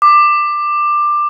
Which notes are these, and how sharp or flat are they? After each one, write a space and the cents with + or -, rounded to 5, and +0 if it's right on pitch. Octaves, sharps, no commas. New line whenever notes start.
D6 +15